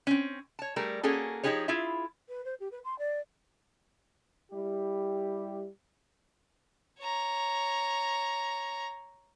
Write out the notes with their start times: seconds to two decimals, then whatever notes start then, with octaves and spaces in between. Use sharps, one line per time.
0.07 C4 C#4
0.59 C#5 A5
0.76 G3 A3 G#4 A#4
1.03 A#3 C#4 F#4 G#4 A4
1.43 F3 A3 D#4 G4 G#4 C#5
1.68 E4 F4 G#4 E5
2.29 B4
2.45 C5
2.60 G4
2.72 B4
2.84 C6
2.99 D5
4.52 G3 E4 G4
7.00 C#5 A#5